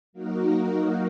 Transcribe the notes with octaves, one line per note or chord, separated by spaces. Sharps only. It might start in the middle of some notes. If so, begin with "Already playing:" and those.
F#3 A#3 D#4 F#4 A#4